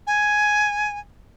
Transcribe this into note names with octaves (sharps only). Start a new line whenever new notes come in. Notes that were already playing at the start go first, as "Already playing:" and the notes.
G#5